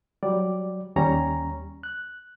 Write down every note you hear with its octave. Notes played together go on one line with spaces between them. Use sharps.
F#3 G3 D5
D#2 G3 C#4 C#5 A#5
F#6